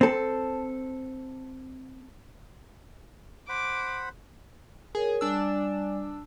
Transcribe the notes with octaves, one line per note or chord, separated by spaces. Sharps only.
C4 A4
C5 F#5 B5 D6
G#4 A#4 C#5
G3 D4 D5 G#5 E6